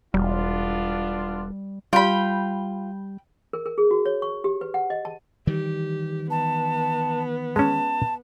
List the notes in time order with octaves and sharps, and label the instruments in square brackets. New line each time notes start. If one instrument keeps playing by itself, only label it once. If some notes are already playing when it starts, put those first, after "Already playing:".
[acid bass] E1 [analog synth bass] G3 [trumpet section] B3 D4 F4
[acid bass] G3 [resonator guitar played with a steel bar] F4 [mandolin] G5 B5
[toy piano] A#4
A#4
G#4
F#4
C#5
C#6
G4
B4
F#5
D#5
A5
[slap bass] D#3 E3 G3 [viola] G4
[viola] B3 [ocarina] A5
[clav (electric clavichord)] G#3 C#4 [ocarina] A5